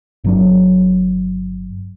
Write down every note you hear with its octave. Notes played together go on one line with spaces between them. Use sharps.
G1 F#3 D4